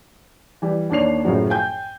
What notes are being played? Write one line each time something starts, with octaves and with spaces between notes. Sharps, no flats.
E3 G3
D#2 A#3 D4 C#5 C7 F7
F#2 A2 C#3 F3 F#3
G5 G#5 G6